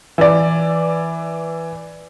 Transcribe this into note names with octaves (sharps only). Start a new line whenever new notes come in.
E3 D5